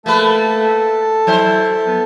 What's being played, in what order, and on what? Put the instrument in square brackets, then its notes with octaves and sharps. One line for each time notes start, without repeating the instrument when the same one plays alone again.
[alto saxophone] A3 [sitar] A#3 B4 [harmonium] A4 A5
[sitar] F#3 C5 [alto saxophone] E4
[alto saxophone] B3